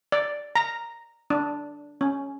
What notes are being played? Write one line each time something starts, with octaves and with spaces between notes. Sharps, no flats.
D5
A#5
D4
C#4